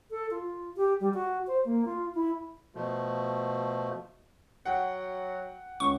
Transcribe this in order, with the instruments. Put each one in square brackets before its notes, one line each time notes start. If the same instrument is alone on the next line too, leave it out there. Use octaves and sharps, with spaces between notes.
[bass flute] A4
F4
G4
G3
F#4
C5
A#3
F4
E4
[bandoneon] B2 F3 A3
[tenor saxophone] F#3 [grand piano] F#5 G5
[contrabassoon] C#2 [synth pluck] C#6